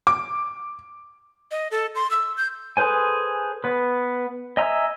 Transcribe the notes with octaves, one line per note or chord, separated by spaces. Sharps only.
D6
D#5
A4
C6
E6
G6
G#4 A4 B4 C5 G#5
B3 B4
D#5 E5 G#5 A#5 E6